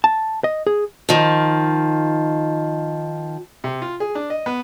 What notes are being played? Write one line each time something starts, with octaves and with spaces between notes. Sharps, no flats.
A5
D#5
G#4
D#3 F3
C3
F4
G#4
D4
D#5
B3